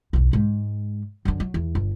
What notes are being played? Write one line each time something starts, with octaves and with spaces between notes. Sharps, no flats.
B1 E2
G#2 G#3
F#2 D3
F#3
E2
G1